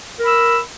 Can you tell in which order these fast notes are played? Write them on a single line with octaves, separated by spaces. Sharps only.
A#4 B5 E6